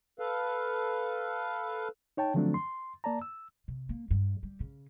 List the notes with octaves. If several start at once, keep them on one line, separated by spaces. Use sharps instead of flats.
A4 B4 F5
D#4 C#5 G5 A5
D3 F3 F#3 A3 C4 D4
C6
A#3 D5 A5 A#5
E6
C3
A#3
G2
G3
C#3